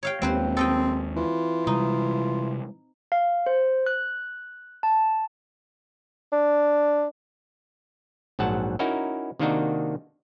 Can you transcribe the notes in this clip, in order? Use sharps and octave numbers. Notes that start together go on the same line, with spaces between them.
C#5 F5 G5
D#1 D#2 G#3 C4 B4 C5
C4 A4 D#5 G5
E3 F4
C3 G3 G#3 D#4
F5
C5
F#6
A5
D4
A#1 G#2 F#3 F#5 A5
C#4 D#4 E4 F#4 A#4
C3 D#3 A#3 D4 D#4 F#4